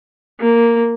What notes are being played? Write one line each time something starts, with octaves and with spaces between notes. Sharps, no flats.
A#3